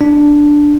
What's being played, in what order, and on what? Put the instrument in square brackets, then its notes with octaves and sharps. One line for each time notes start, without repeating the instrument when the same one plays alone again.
[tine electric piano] D4